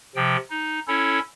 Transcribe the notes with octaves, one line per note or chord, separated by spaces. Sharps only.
C3 F3 G5
D#4
C#4 E4 A4 C#5